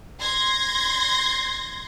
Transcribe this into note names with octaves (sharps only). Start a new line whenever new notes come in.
C6 G6 G#6 A#6